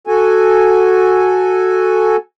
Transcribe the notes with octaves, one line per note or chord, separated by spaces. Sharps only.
F#4 A4 G#5